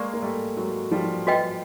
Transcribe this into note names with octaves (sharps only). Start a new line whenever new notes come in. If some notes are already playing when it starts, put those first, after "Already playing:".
Already playing: G#3 A#3 B4 D5 F5 A#5 C#6
A#3
G3 A3
F#3 G#3
F3 G3
F#4 B4 D#5 G5